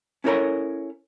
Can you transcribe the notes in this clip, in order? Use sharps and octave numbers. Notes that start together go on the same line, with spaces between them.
C#4 E4 A4 A#4 C#5 A#5